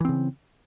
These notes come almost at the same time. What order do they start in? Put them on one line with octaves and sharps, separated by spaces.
E3 C4 C#3